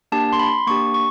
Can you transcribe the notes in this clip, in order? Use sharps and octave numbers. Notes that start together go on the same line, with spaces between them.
A#3 D4 G4 A5
C6
B5
A#3 D4 G4 C#6
C#6